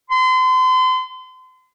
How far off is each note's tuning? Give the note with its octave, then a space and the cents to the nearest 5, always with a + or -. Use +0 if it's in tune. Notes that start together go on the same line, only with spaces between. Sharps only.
C6 -35